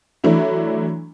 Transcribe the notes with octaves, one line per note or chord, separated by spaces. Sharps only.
E3 F#3 A3 D4 E4